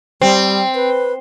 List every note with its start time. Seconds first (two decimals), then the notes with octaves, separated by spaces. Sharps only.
0.21 G3 C4
0.75 B4